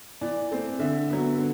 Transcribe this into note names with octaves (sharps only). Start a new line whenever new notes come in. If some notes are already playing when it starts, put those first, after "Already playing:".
E3 D5
A3 C4
D3 E5
F#3 B3
D3